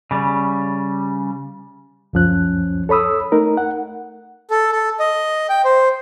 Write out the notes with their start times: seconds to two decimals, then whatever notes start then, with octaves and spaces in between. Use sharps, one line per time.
0.11 C#3 G3
2.13 C#2 F#2 F3 C#4 F#6
2.89 A4 C#5 B5 D#6 E6
3.32 A3 D#4 A#4
3.57 F#5
4.50 A4
4.72 A4
4.99 D#5
5.49 G5
5.65 C5